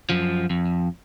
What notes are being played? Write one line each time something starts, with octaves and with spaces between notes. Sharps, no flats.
F#2 F3
F2